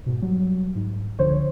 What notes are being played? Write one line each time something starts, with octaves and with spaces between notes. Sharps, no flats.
G#2 B2
F#3 G3
G#2
C#2 D3 F3 C5 C#5